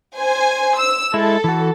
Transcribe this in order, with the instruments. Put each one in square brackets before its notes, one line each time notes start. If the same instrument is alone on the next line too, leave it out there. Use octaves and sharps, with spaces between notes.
[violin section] C5 G#5
E6
[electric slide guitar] G#3 E4 [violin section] A4
[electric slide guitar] E3 F#4